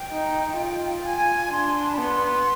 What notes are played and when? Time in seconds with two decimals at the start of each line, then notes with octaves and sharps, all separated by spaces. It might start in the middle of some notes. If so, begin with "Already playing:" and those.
Already playing: G5
0.12 D#4
0.58 F4
1.05 G#5
1.51 D4 C6
1.91 B5
1.98 B3 C6